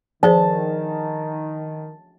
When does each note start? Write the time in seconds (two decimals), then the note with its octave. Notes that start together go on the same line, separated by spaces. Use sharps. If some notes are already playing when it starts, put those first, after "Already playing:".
0.23 D#3 F3 G#4 C5 A5